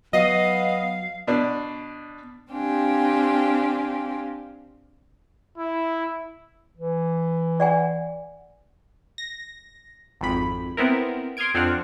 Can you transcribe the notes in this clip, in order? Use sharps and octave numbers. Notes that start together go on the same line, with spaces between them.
F#3 B3 D#5 F5
B2 D4
C4 D4 G4 F5 G5 G#5
E4
E3
D5 F#5 G#5
A#6
G#1 F2 B5
B3 C4 E4 A#4
C6 D#6 F6 G#6 D7
F2 C4 D4 F#5 F6